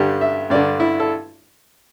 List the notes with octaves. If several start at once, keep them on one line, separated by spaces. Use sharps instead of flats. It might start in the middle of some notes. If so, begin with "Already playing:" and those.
Already playing: G2 D3 G4
E5
G2 D3 D5
E4
A4